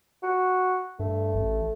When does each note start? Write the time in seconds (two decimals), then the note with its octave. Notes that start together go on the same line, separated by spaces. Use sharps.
0.23 F#4
0.99 G2 A3
1.34 A1